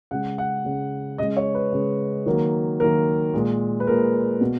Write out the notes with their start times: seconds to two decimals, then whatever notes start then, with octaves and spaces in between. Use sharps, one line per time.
0.11 C#3 G#3 F#5
0.38 F#5
0.65 C#3 G#3
1.18 C#3 G#3 D#5
1.37 C#5
1.55 B4
1.72 C#3 G#3
2.26 D#3 F#3 A#3
2.80 D#3 F#3 A#3 A#4
3.34 A#2 G#3
3.80 B4
3.87 A#2 G#3 A#4
4.41 B2